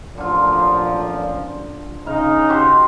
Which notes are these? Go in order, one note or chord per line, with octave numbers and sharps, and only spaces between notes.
A1 A#2 D3 F3 F4
C#3 D#4 F5
F#4 G4 C5